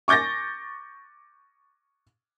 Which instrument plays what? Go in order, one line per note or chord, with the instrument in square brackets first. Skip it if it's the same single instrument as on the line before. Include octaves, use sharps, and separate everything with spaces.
[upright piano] C#6 D6 G6 A6 A#6